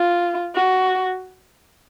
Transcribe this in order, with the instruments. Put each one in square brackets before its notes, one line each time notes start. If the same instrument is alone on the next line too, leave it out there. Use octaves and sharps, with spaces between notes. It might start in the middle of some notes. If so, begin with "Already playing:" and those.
Already playing: [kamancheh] F4
F#4